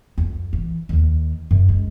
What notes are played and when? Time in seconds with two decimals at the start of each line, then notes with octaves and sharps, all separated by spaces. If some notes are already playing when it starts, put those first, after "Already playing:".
0.18 F2
0.53 E3
0.89 D#2 D#3
1.51 F#2
1.69 G#3